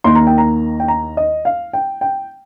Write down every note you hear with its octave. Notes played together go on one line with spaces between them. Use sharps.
D#2 D#3 A#3 C6
A#5
G5
A#5
G5
A#5
D#5
F5
G5
G5